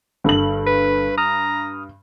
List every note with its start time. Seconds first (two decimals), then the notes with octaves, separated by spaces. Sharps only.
0.24 G1 G2 A4 F#7
0.67 B4
1.18 A#5 D#6 F6